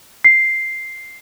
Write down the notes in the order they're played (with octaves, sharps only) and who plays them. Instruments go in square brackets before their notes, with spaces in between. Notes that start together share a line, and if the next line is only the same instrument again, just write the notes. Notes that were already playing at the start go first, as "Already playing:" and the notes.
[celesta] C7